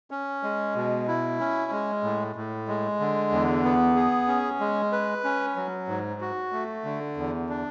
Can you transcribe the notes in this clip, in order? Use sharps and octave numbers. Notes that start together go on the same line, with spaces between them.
C#4
G#3
B2
E4
C#4
G#3
A2
A2
G#3
D3
E2
B3
G#4
C#4
G#3
B4
C#4
F#3
G#2
F#4
A3
D3
E2
D4